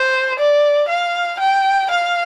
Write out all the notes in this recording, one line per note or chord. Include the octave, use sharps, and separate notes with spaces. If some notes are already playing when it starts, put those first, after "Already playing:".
Already playing: C5
D5
F5
G5
F5